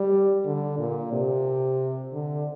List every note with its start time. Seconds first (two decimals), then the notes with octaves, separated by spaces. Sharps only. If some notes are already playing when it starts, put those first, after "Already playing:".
Already playing: G3
0.45 D3
0.79 A#2
1.12 C3
2.13 D3